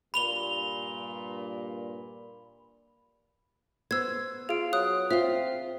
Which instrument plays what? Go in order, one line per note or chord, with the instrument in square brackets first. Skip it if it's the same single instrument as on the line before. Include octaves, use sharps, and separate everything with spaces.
[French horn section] G2 A#2 [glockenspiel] B5 F7 G7
[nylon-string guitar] B3 C5 [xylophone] E6 G#6
[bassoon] F4 [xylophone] G#4 D7
[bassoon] F#3 [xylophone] D#6 F#6
[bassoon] C4 [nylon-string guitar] F4 [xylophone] E5 F5